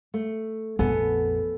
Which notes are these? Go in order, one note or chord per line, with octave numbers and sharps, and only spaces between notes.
A3
A#1 F2 B3 A4 G#5